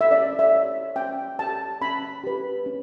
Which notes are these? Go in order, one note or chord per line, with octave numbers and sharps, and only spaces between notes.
E5
C#4 D5
E5
G4 C#5
C#4 G5
G4 C#5 A5
C#4 B5
G4 B4
C#4